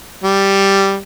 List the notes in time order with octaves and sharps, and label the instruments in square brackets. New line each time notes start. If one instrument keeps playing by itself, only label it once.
[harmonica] G3